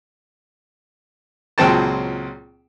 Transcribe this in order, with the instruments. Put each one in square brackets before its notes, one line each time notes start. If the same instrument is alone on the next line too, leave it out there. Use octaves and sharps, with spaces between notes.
[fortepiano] C#2 A#2 F#3 C4 G5 A5